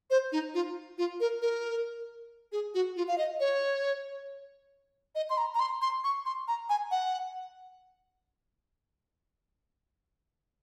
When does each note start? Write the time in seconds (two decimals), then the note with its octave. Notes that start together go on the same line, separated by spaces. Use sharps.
0.10 C5
0.32 D#4
0.54 F4
0.98 F4
1.20 A#4
1.42 A#4
2.52 G#4
2.74 F#4
2.96 F4
3.08 F5
3.18 D#5
3.40 C#5
5.15 D#5
5.30 C6
5.38 A#5
5.55 A#5
5.60 C6
5.82 C6
6.04 C#6
6.26 C6
6.48 A#5
6.69 G#5
6.91 F#5